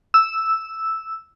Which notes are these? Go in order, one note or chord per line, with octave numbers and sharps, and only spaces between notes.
E6